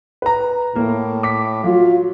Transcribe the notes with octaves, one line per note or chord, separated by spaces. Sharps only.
B4 A#5
A2 A#3 A#4
D6 B6
F#3 F4